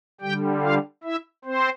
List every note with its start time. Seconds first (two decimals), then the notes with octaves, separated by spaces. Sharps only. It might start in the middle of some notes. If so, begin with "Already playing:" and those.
0.21 D3 G3 G4 G5
0.62 F4 F5
1.03 E4 E5
1.44 C4 C5